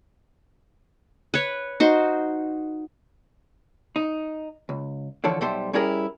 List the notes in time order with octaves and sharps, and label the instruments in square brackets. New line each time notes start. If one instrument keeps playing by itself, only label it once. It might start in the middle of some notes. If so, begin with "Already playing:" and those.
[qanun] B4 C#5
D#4 F#4 C5
[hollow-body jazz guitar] D#4
C#2
D3 E3 F3 A4 C#5 F#5
B1 G3 A4 C5 E5 C6
G3 C#4 E4 G4 G#4 A#4